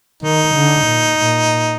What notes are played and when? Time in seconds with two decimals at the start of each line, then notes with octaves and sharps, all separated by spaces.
0.23 D#3 D#4
0.55 D3
0.86 A#2
1.18 A#2